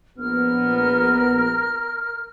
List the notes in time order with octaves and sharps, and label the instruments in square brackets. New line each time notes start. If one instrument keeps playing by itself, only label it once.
[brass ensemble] A#1 B3 [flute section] A#4 F6